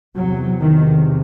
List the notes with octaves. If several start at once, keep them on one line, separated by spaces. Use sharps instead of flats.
E2 C3 F#3
D#3